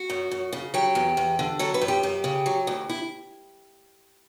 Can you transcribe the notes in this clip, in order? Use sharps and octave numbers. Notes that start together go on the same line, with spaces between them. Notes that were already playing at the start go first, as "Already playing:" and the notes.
Already playing: F#4
F#2
F#2
C#3
F#3 G4
E2
E2
D3
F#3 A4
B4
F#2
G4
F#2
C#3
F#3
D2
E4